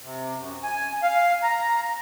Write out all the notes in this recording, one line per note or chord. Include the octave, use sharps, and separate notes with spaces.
C3
F#2
G#5
F5
A#5